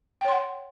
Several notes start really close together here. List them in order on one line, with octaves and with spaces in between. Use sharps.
G5 C#5 C6 F#5